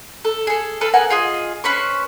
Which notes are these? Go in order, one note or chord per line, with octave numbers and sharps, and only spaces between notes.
A4
G#4 A4
A4 B4 F5
B3 A#4 F#5 G#5
F4 G#4 D#5
C#4 B4 C5 C#6